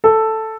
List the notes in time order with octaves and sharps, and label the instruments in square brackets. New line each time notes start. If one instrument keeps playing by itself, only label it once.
[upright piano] A4